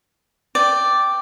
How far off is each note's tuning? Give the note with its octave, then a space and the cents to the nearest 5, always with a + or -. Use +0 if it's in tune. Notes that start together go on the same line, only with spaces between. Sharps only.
D5 +0 G5 -5